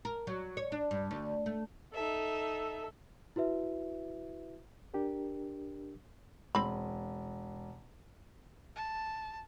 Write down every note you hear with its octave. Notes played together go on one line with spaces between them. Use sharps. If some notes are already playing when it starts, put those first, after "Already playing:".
A#4
F#3
C#5
D4
G2
D2
A3
D#4 A4 E5
E4 F#4 B4 E5
D4 G4 A#4
E1 C4 B5
A5